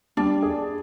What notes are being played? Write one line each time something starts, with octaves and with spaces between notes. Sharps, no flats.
G3 D4
G#4